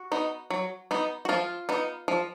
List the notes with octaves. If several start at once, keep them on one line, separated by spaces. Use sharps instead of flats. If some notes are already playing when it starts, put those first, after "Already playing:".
Already playing: F#4
B3 D#4
F#3
B3 D#4
F#4
F3 F4
B3 D#4
F3